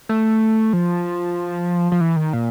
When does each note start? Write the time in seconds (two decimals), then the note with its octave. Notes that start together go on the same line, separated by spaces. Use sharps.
0.09 A3
0.73 F3
1.92 F3
2.01 E3
2.16 D#3
2.33 A#2